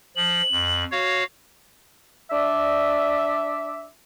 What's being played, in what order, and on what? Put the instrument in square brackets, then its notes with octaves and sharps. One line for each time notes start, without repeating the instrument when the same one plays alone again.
[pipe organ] F3 [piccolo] F#7
[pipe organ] F2
F#4 C#5 F5
[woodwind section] D4 D5 E5